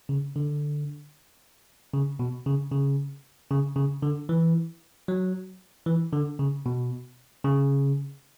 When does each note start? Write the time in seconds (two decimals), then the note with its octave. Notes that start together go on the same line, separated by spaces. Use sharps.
0.09 C#3
0.36 D3
1.94 C#3
2.19 B2
2.46 C#3
2.72 C#3
3.51 C#3
3.76 C#3
4.02 D3
4.29 E3
5.08 F#3
5.86 E3
6.13 D3
6.39 C#3
6.66 B2
7.44 C#3